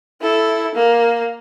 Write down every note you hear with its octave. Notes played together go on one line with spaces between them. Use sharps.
E4 A4
A#3